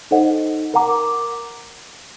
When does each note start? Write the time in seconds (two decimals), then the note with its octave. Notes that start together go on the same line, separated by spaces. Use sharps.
0.11 D#4 A4 C5 D#5 F#5
0.74 A#4 F#5 A#5 D6